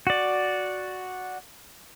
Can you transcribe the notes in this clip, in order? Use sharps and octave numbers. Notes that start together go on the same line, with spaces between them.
F#4 D5